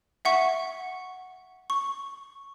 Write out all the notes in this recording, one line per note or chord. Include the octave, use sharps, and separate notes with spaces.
E5 F#5 C#6
C#6